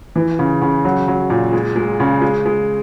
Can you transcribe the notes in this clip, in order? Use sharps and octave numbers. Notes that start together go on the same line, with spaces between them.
E3
C#3
C#3
F#3
F#3
A#2
G#3
G#3
C#3
G#3
G#3